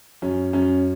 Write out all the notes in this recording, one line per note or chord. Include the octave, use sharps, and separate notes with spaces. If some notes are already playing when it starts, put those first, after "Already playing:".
F#2 C#4
F#2 C#4